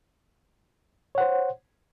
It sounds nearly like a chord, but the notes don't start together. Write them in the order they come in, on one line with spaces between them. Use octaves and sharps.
C#5 F#5 C5